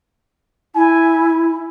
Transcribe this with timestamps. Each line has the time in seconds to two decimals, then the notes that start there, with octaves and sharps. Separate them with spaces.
0.75 E4 G#5